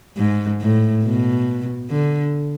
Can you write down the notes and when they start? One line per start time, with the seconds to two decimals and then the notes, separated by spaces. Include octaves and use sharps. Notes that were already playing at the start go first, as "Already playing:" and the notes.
0.17 G#2
0.61 A2
1.04 B2
1.90 D3